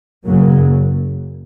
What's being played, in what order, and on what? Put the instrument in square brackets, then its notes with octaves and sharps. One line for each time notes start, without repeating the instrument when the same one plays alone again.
[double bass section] F#1 F#2 C#3 F#3 A#3